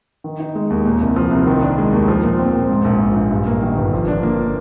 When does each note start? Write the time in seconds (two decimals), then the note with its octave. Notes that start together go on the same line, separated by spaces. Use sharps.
0.24 D#3
0.40 D#4
0.55 G#3
0.70 D#2
0.85 A#2
1.01 C2
1.16 F3
1.31 C2
1.47 D#3
1.62 D4
1.78 G#3
1.93 D#2
2.08 F3
2.24 A#2
2.39 C4
2.54 A#2
2.70 G#2
2.85 A#1
3.01 F3
3.16 A#1
3.31 G2
3.47 A#3
3.62 D#3
3.77 G1
3.93 F3
4.08 D4
4.23 A#3